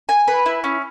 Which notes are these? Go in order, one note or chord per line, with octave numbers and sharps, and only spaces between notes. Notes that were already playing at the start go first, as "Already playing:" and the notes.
G#5
B4
E4
C#4